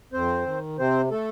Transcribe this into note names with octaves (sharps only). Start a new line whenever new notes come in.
F2 C4 C5
D#3
C3 C4 C5
A3 A4